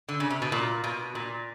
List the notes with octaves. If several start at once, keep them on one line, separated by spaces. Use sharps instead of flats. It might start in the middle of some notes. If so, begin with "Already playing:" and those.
D3
C#3
C3
B2
A#2
B2
A#2